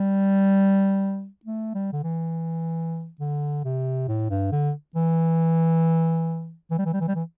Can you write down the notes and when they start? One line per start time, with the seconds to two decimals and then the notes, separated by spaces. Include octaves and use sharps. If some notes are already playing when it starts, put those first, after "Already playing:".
Already playing: G3
1.45 A3
1.75 G3
1.93 D3
2.03 E3
3.20 D3
3.64 C3
4.08 A2
4.30 G2
4.52 D3
4.96 E3
6.71 E3
6.79 G3
6.86 E3
6.94 G3
7.00 E3
7.08 G3
7.15 E3